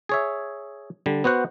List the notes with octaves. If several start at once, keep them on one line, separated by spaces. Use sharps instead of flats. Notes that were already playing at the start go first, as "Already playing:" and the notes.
G#4 C#5 E5
D3 G3
B3 F#4 C5 F#5